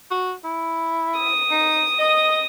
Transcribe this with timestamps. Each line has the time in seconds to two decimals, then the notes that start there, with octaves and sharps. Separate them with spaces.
0.10 F#4
0.44 E4
1.18 D#6
1.51 D#4
1.99 D#5